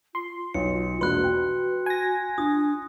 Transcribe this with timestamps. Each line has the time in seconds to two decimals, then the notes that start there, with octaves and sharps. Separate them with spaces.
0.15 F4 C6
0.54 B1 C#7
1.01 E1 A#1 F#4 B4 C6 F#6
1.24 G5
1.86 G#5 A#6
2.38 D4 F4 D#6